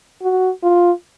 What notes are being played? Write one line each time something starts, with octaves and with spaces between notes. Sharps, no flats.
F#4
F4